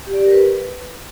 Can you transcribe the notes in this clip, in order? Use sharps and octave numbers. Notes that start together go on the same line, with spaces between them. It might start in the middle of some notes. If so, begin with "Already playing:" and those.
G4
D5
G4
A#4
B4